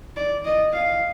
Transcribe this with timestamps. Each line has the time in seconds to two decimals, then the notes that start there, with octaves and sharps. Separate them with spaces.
0.17 D5
0.45 D#5
0.73 F5